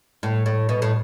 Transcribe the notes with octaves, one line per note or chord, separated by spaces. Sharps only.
A2
A2
B2
A2